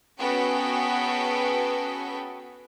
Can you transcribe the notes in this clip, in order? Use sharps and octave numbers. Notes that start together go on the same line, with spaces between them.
B3 C#4 F#4 G#4 A4 G5